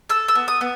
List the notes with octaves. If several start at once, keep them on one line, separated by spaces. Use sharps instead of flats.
A4 E6
E6
B3
D#6
B3